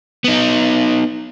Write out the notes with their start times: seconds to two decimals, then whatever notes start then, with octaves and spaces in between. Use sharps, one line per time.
0.24 B3 D#4